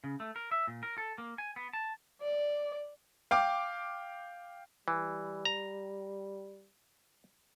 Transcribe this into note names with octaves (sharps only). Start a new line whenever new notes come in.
C#3
A3
A#4
E5
A#2
A#4
A4
A#3
G#5
B3
A5
D5
F5 G5 D6
E3 G3
A#5